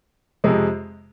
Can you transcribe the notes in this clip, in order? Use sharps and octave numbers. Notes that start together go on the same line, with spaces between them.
F2 C3 G#3